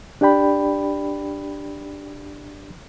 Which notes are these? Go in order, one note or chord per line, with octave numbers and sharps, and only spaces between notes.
D4 G4 D5 G5 B5